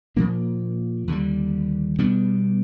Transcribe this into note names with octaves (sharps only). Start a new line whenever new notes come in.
A#2 F3 A#3 D4
D#2 D3 G3
B2 G3 B3 D4